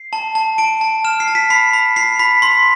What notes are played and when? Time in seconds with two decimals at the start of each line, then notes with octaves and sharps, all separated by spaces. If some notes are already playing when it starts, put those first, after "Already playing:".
Already playing: C7
0.13 A5
0.35 A5
0.58 A5 D7
0.81 A5
1.04 F6 E7
1.20 C7
1.28 A5
1.35 B6
1.50 B5 C7
1.73 B5
1.96 B5 C7
2.19 B5 B6
2.42 C6 B6